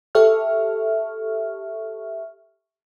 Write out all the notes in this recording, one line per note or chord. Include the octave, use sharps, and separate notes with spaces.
G4 A4 E5 C#6 F6